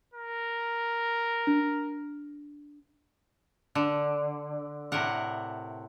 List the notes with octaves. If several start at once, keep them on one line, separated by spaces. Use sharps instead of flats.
A#4
D4
D3
A2 C3 A#4 F#5